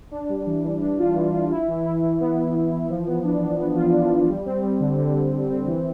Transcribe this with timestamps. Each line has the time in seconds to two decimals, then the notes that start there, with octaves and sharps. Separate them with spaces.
0.11 D4
0.29 G3
0.46 E3
0.64 E3
0.81 D4
0.99 F4
1.15 E3
1.33 F4
1.51 E4
1.68 E3
1.85 E4
2.02 E3
2.20 B3
2.37 E3
2.55 B3
2.72 E3
2.89 F3
3.07 B3
3.24 D4
3.42 D4
3.59 B3
3.76 F4
3.93 D4
4.10 F3
4.28 G3
4.46 C4
4.63 G3
4.80 D3
4.98 D3
5.15 D3
5.32 D3
5.49 C4
5.67 E3